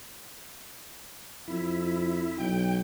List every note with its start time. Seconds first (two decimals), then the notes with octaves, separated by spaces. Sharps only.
1.48 F2 E4
2.38 B1 G5